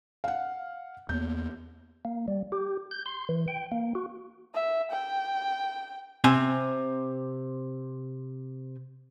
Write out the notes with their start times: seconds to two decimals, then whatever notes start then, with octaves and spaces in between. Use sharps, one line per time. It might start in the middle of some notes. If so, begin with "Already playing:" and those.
0.24 F5 F#5
1.09 E2 A#3 B3 G6
2.05 A#3
2.28 G3
2.52 G4
2.91 G6
3.06 C6
3.29 E3
3.48 G5
3.72 A#3
3.95 F#4
4.54 E5
4.91 G5
6.24 C3 C4 G#5